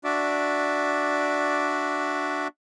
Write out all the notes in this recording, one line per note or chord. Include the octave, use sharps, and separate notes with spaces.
D4 F#4 D5 E5